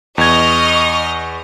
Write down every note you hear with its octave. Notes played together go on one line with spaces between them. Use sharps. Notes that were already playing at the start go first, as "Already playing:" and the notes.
E2 D#5 C#6 D#6 F6 G#6